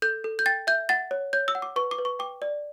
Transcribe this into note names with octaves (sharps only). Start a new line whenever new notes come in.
A4 G6
A4
G6
G5 A6
E5 G6
F#5 A6
C#5
C#5 G6
E6
F#5
D6
B4 C#6
D6
B4
C#6
G5 D6
D5